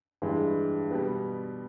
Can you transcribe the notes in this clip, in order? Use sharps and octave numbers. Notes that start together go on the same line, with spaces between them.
G2 E3 G#3
B2 G3 B3